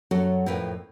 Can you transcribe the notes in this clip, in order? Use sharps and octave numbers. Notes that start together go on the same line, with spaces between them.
F#2 F#3 F#4 A4 C#5
F2 A2 F4 A#4 B4 G5